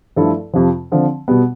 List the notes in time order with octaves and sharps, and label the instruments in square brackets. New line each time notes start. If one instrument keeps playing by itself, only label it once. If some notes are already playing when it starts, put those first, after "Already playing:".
[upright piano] G2 F3 A3 E4 A4
F2 C3 F3
D3 F3 C4
B2 G3 B3